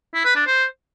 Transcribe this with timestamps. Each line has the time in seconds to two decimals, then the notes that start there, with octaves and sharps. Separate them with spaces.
0.14 E4
0.25 B4
0.36 D4
0.47 C5